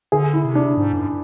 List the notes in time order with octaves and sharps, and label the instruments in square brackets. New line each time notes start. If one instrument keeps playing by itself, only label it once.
[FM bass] D3 [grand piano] G#4
[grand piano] E4
[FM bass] C3
[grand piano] D4
[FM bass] G#2
F#2